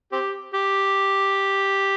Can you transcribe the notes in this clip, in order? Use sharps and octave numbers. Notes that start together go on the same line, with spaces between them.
C4 G4
G4